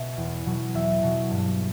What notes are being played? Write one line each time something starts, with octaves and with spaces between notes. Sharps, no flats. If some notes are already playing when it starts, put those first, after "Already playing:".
Already playing: B2 E5
E2
B2 F#3
E2 E5
B2 F#3
G2